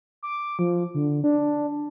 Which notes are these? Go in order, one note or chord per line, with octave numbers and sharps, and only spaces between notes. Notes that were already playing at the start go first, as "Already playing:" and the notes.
D6
F3
D3
D4